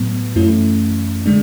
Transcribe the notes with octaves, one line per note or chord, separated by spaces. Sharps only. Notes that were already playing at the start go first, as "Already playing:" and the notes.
Already playing: A2 F#3 B3
F#2 E3 A3 C#4 E4
D3 G#3 D4